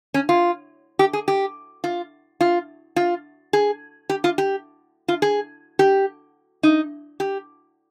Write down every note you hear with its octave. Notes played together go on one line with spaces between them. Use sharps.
C#4
F4
G4
G#4
G4
F4
F4
F4
G#4
G4
F4
G4
F4
G#4
G4
D#4
G4